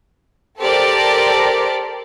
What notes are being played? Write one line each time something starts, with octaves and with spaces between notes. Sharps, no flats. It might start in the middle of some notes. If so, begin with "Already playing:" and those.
G4 A4 A#4 C5 D5